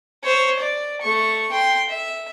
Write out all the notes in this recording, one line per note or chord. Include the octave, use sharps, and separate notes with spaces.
C5 C#5
D5
A3 C#6
G5 C6
E5